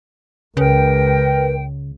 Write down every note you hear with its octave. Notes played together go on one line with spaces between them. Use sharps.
C#2 C#3 A#4 B4 G5